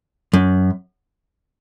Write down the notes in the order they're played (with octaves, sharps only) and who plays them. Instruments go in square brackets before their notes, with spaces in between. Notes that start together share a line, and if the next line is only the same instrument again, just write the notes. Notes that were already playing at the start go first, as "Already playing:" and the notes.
[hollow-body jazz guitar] F#2